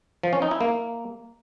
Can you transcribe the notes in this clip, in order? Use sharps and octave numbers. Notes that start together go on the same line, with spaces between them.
F3
C#4
D#4
E4
A#3